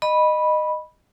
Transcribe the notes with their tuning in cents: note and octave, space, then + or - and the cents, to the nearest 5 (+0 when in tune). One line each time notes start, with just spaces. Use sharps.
D#5 -15 B5 -10